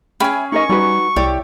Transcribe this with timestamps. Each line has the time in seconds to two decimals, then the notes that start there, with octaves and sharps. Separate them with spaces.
0.20 C#4 G#4 E5 G5 B5
0.52 D#4 A#4 D#5 C#6
0.70 G3 D#4 F#4 B4
1.16 C2 E4 G4 C#5 D5